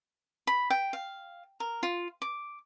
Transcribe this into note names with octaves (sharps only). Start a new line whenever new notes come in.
B5
G5
F5
A#4
F4
D6